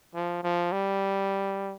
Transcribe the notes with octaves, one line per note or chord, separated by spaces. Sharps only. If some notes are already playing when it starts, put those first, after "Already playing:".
F3
F3
G3